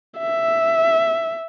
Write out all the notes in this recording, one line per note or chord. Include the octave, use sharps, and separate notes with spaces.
E5